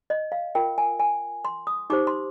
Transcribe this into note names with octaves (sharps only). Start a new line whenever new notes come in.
D#5
F5
F4 A#4 G5
G#5
G#5
C6
D#6
D#4 G4 C5 D6
C6